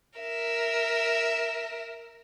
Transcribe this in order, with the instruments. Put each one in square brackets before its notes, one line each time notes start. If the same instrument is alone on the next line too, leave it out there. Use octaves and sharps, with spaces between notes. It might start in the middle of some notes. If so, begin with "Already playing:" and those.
[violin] A#4 E5